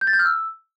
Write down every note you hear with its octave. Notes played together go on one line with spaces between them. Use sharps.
G6
A6
G6
F6
E6